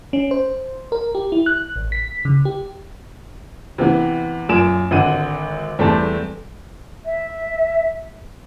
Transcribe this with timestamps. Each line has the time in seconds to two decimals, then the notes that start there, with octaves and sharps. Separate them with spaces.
0.13 C#4
0.31 C5
0.92 A#4
1.15 G4
1.32 E4
1.46 F#6
1.76 A1
1.92 B6
2.25 C#3
2.45 G4
3.78 C3 E3 B3
4.49 F#2 A#2 G#5 D7 E7
4.91 G#1 D3 F#5 D#7
5.79 E2 G3 A3 C4 G4 A5
7.05 E5